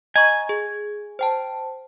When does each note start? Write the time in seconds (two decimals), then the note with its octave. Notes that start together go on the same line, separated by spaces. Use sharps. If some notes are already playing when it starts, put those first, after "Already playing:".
0.16 D#5 G#5 A#5 C#6
0.49 G#4
1.19 C5 G5 A5